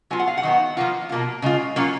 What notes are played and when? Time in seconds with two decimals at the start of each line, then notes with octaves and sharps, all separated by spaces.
0.10 F#3 B3 F4 G#5
0.19 F#5
0.28 F5
0.37 F#5
0.43 D#3 F#3 B3
0.77 F3 A#3 F4
1.09 B2 A#3 F4
1.42 C#3 G#3 F4
1.76 F#3 A#3 C#4 F4